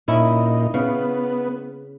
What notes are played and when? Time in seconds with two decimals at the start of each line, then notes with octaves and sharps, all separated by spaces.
0.08 A#2 C#4 D#4 E4
0.74 C#3 B3